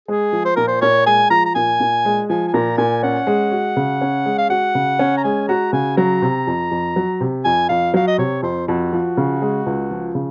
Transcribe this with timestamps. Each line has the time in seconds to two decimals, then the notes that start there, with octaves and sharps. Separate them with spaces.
0.08 G#3 G#4
0.33 F3
0.45 C5
0.56 A#2 A#4
0.68 C5
0.82 A#2 C#5
1.06 G#3 G#5
1.30 F3 A#5
1.46 A#5
1.55 A#2 G#5
1.80 A#2
2.05 G#3
2.29 F3 G#5
2.48 G#5
2.54 A#2 A#5
2.78 A#2 G#5
3.03 C#4 F#5
3.27 G#3
3.51 F#4
3.76 C#3
4.01 C#4
4.26 G#3
4.38 F5
4.50 F#4 F#5
4.75 C#3
4.99 C#4
5.18 A#5
5.24 G#3 G#5
5.49 F#4 A#5
5.73 C#3 G#5
5.97 F#3 A#5
6.22 C3
6.47 F2
6.71 F2
6.96 F#3
7.21 C3
7.45 F2 G#5
7.69 F2 F5
7.94 F#3 F5
8.07 D#5
8.18 C3 C#5
8.43 F2 C5
8.68 F2 F#4
8.93 F3
9.17 C#3
9.42 G#3
9.66 C#2
9.91 F3
10.15 C#3